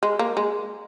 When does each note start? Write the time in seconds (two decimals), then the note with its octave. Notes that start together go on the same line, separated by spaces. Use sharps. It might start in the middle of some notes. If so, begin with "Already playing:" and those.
0.03 G#3
0.19 A#3
0.37 G#3